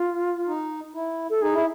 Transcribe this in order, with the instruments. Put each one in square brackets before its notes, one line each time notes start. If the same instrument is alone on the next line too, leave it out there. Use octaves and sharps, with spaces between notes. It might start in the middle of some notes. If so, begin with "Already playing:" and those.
Already playing: [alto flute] F4
[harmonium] D#4
E4
[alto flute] A4
[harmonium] D#4 [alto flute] G#4
[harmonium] E4